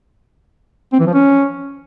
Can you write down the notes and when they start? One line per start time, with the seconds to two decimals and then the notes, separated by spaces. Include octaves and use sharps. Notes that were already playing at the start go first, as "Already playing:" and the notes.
0.93 C4
1.00 E3
1.07 F3
1.14 C#4